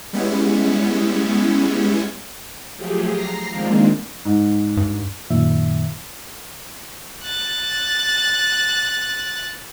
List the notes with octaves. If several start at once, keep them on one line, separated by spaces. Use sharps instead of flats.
G3 G#3 B3 C#4 E4
F3 F#3 A3 G4 G#4
A#5 A#6 C7
D#3 F3 G#3 A#3 C4 D4
G#2
G2
F#2 A#2 D#3 E5
F#6 A6